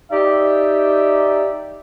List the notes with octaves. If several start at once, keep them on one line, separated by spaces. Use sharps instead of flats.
D#4 G4 D5 E5